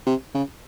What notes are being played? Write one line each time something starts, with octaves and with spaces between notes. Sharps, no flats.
C3
C#3